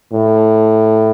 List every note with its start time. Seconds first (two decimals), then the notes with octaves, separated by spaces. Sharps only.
0.13 A2